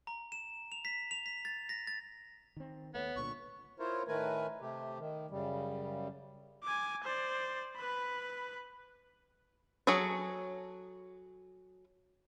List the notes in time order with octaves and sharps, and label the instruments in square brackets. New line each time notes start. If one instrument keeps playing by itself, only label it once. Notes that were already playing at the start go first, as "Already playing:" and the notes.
[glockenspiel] A#5
E7
F7
B6
F7
B6
A6
A#6
A6
[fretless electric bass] D#3 C4
[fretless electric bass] D#2 A3 [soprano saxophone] B3 [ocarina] C#5
[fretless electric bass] C2 A#2 D3 [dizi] C#6
[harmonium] E4 F4 A#4 C5 C#5
A2 D#3 A3 A#4 B4 G#5
C3 A3 G4
D#3
F#2 C#3 G3
[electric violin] G#5 D6
C5 D5
B4 B5
[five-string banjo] F#3 G#4 A4 C#5